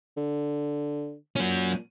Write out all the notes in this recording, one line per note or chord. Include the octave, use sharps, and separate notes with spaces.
D3
A#2 F#3 C#4